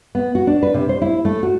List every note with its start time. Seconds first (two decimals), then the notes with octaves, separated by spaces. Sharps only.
0.15 B3
0.35 F#4
0.47 D4
0.63 B4
0.74 C3
0.89 C5
1.02 E4
1.25 A3
1.43 F#4